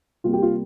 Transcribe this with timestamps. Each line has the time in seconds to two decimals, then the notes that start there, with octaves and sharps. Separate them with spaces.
0.24 C3 G3 A#3 F4
0.33 G4
0.42 F4